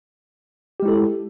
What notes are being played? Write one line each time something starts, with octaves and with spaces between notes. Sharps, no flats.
G#3 E4 G4 A4